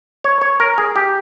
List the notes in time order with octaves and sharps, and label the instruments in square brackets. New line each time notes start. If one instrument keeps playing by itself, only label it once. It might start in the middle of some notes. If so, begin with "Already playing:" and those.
[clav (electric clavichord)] C#5
C#5
A#4
G#4
G4